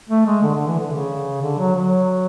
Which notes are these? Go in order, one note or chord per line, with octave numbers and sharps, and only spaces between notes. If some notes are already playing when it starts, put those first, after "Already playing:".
A3
G#3
D3
D3
E3
D3
C#3
D3
F#3
F#3